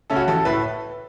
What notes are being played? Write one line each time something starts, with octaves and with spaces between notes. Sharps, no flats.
C#3 A3 C#4 A4
F#4
A1 A4
A2 A3 B4